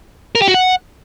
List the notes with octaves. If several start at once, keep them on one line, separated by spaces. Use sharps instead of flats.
A#4
G4
F#4
F#5